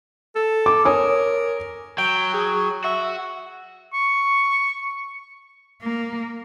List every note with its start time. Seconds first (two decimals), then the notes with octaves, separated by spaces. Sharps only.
0.35 A4
0.66 D6
0.85 A#4 C#5 G#5 D#6
1.98 F#3 G5
2.34 G#4
2.84 F#4 E5
3.93 C#6
5.82 A#3